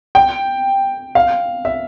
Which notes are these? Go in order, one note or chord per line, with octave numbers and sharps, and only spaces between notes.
G5
F5
E5